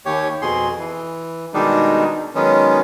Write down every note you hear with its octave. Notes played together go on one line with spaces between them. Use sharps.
D#2 G4 C#5
F2 B2 G#4 C6
E3
B2 D#3 G3 G#3 D4 D#4
D#3 F#3 G#3 B3 C#4